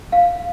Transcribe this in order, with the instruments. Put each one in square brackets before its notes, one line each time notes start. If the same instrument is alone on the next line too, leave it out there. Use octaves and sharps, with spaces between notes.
[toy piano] F5